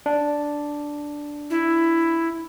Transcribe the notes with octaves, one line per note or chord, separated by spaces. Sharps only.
D4
E4